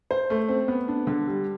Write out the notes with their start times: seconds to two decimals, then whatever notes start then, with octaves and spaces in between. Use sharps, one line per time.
0.11 C5
0.30 A3
0.49 C4
0.68 B3
0.88 D4
1.07 D3
1.27 G3